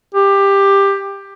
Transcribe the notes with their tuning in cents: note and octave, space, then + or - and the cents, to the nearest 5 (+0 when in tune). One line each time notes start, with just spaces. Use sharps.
G4 +15